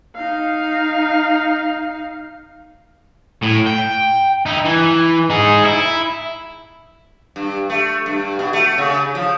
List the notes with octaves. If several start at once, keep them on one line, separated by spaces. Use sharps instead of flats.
D#4 F5
A2
G5
D#4 E4
E3
D#4 G#4
E4
G2
A3
G2
B2
A3
C#3
F3